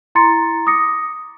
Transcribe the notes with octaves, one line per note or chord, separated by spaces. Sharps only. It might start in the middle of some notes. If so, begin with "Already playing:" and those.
E4 A#5 C6 A6 C#7
D6 D#6 A#6 C#7